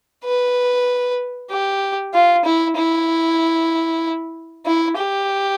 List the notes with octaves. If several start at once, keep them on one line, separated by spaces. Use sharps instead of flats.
B4
G4
F4
E4
E4
E4
G4